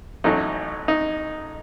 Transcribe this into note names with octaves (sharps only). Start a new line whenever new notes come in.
A1 A2 F#3 A3 D#4
D#4